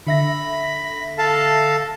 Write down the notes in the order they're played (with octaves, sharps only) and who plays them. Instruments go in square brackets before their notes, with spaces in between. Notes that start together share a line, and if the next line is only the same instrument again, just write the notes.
[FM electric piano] D3 E5 A#6 [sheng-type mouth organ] B5
[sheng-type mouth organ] A4 F5 A5